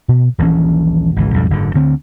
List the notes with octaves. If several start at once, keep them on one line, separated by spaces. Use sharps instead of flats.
B2
D#1 A#1 E3 C#4
G#1 C#2 E3
B1 F2 G#2 G3
F#1 G#2 D3
D2 D3 C4